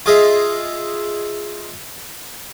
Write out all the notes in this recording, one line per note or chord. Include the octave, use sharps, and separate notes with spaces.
F4 G#4 D#5 E5